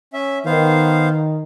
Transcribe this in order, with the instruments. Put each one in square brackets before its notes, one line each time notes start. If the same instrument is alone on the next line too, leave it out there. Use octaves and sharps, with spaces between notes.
[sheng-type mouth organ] C#4 E5
[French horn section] D#3 [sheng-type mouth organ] B3 C5 F5